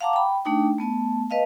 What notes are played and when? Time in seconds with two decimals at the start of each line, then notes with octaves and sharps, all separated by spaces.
0.01 F5 F#5 A5 A#5 D6
0.13 G5 B5
0.45 A3 D4 D#4 G5
0.78 A3 B3 A5
1.30 B4 D#5 F5 A5